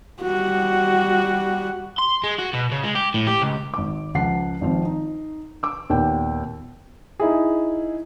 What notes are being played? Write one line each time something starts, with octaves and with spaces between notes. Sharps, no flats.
G3 F#4
C6
G#3
F#4
B2
C#3
G#3
G4
A2
G4
C#2
G#1 D6
C#2 F3 F#5 C7
G#1 F3 C4
D#4
D6 E6
D#2 A#2 B3 G5
D#4 E4 G#4